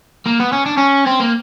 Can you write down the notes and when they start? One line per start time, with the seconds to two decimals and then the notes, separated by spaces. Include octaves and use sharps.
0.26 A#3
0.40 B3
0.52 C#4
0.66 D4
0.77 C#4
1.07 C4
1.20 A#3